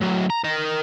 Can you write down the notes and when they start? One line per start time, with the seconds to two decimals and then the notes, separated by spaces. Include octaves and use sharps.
0.01 A2 F#3
0.30 A#5
0.44 A#4 D#5